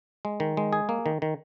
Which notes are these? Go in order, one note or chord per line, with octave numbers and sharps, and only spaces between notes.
G#3
D#3
G#3
G#4
A#3
D#3
D#3